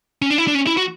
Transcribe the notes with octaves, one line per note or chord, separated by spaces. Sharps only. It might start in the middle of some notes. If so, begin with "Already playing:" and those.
C#4
D4
E4
D4
C#4
E4
F#4